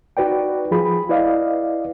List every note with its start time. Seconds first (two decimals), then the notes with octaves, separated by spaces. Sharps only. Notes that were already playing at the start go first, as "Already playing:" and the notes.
0.17 D#4 F#4 B4 D5 G5
0.71 F3 F4 G#4 B5
1.09 E4 B4 D5 D#5 F5